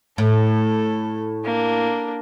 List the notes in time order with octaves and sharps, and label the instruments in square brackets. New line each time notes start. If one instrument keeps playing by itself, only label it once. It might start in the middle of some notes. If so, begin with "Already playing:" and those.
[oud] A2 [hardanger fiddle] A4
[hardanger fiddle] A#3 D4